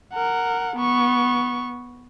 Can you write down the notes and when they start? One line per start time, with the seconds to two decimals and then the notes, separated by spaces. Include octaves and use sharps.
0.14 A#4 F#5
0.77 B3 C#6